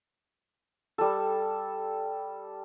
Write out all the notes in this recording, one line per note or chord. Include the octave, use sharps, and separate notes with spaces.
G3 A4